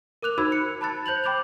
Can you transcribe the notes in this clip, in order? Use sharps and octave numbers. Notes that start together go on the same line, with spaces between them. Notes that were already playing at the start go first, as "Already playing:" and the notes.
A#4 D6 F#6 F7
D#4 F#4 C5 B5 E6 G#6
C#7
A5 B5 F#6 A6
C5 G6 F7 F#7
G5 B5 D6 G6 F7